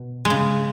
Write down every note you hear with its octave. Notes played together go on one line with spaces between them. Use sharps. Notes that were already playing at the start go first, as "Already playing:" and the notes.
Already playing: B2
G#3
C#3